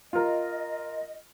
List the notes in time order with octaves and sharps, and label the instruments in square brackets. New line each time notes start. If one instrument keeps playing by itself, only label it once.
[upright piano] F4 A#4 [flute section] D#5